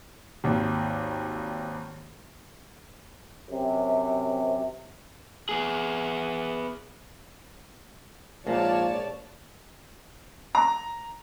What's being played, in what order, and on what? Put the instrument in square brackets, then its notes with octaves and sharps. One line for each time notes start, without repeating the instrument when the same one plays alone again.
[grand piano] G#1 D#2
[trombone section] F#2 C3
[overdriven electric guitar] B3 G#4
[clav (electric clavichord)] A#1 [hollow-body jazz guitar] G#2 A#3 [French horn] F3 [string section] C#5 D5 A5
[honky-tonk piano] A#5